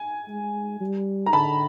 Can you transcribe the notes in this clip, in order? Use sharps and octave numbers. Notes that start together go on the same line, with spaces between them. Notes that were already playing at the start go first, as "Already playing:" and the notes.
Already playing: G#5
G#3
G3
A#5
D3 A5 B5